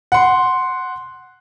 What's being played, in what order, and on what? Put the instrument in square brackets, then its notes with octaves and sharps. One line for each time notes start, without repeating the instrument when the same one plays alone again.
[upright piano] F#5 C6